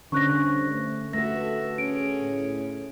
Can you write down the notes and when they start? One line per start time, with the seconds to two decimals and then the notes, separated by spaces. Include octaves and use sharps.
0.12 G2 D3 C#4 D4 C5 C#6 F#6 A#6
0.70 A3
1.13 A3 F#4 A4 B4 E5 A#6
1.78 C#4 G#4 D7
2.19 A2